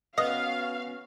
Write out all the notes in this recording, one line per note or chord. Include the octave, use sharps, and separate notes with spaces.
B3 C#4 F#4 D#5 F5